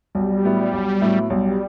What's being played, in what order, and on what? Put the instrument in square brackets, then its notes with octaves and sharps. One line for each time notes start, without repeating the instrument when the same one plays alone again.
[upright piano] B1 [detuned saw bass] G3
[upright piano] A2 F#3 B3 E4
B1
A2 F#3 B3 E4
[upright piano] B1 [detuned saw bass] G3